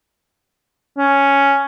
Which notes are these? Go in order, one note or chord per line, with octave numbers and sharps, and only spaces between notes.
C#4